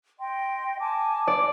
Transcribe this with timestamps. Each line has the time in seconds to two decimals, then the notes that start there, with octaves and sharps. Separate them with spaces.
0.20 D#5 G5 C6
0.80 G#5 A5 D6
1.27 D5